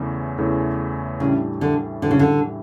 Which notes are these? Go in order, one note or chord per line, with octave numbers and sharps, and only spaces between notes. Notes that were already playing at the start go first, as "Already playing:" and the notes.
Already playing: E2 C#3 E3 A3
E2 C#3 E3 A3
A2 C#3 E3 G3 D4
D3
A2 D3 E3 G3 D4
C#3
D3